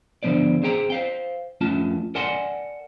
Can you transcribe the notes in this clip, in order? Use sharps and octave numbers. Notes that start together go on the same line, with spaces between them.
D3 F3 B3 C5 D5
C4 G#4 C5 G5 A#5
C5 F5 G5
F2 A3 C#4 F4 A5
A#4 D5 F#5 G#5 A5 C6